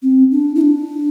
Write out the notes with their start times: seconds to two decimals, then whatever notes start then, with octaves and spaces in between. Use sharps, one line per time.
0.02 C4
0.31 D4
0.55 E4
0.61 D4